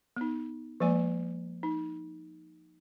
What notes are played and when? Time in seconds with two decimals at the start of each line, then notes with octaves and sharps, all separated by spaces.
0.17 B3 D#4
0.80 F3 G#3 A#3 D5 G#5
1.63 D#4